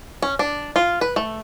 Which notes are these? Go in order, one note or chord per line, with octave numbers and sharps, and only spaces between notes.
C#4
D4
F4
B4
A3